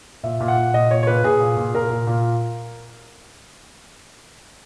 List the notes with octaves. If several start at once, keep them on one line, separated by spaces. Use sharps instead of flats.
A#2 E5
A#2
F#5
A#2
A#2 D#5
A#2 C#5
C#5
A#2 B4
A#2 G#4
A#2
A#2
A#2 A#4
A#2
A#2